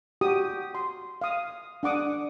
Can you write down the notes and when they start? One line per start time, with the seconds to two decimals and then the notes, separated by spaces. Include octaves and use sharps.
0.21 F#4 G4 D#6
0.75 C6
1.21 F5 D#6
1.83 D4 F#5 D6 D#6